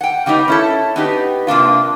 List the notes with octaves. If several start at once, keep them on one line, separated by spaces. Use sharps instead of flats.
F#5 G5
C#3 G3 B3 D#4
C#4 E4 A4
B3 D#4 G4
C3 A#3 D4 F4